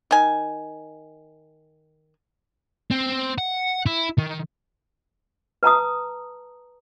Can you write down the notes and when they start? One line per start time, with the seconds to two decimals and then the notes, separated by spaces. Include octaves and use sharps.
0.11 D#3 G#5
2.91 C4
3.38 F#5
3.86 E4
4.18 D#3
5.63 B4 A5 A#5 D#6